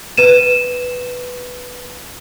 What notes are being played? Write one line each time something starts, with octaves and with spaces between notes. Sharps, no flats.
B4 D#7 E7